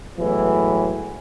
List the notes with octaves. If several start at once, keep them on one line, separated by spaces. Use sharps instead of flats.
A2 E3 F#3 G#3 B3 E4